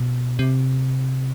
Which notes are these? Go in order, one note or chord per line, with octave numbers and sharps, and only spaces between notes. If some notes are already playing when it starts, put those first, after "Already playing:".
Already playing: B2
C3